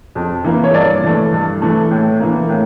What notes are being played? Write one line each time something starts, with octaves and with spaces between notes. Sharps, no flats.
F2
E3 A#3
C#5
G2 D5
E3 A3
G2
E3 A3
A2
E3 A#3
A2